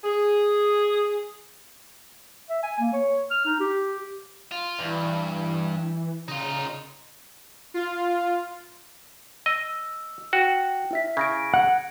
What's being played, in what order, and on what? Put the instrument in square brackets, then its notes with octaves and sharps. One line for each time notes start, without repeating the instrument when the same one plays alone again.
[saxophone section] G#4
[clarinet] E5
G#5
A#3
C#5
F6
D#4
G4
[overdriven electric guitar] F4
[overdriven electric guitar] G2 [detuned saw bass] E3
[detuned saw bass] C#3 [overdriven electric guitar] D#4 F4
[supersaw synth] F4
[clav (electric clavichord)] D#5 [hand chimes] E6
[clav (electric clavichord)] F#4 [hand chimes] G5
[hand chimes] E4 E5 B6
[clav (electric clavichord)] C#3 [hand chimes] G#6 A#6 D7
[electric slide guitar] F#5